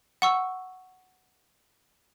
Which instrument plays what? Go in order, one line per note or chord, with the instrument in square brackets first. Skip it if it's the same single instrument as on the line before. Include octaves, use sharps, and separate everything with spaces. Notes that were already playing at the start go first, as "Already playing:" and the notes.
[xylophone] F#5 C#6 E6